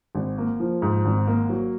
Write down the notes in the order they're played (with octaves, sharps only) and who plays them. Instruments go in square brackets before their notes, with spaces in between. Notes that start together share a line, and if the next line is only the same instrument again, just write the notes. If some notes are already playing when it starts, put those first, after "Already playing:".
[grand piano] G#1
A#3
F3
G#2
G#1
A#3
F#3